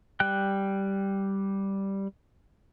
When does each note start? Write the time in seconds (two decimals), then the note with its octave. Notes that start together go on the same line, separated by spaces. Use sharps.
0.20 G3 G5 F#6